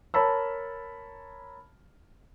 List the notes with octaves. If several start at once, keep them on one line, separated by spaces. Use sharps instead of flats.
A#4 C#5 A5 B5 E6